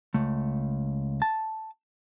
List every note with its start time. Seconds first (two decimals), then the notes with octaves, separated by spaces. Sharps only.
0.14 C#2 A3
1.22 A5